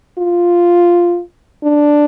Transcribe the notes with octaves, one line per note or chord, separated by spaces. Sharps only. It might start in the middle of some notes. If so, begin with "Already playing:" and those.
F4
D4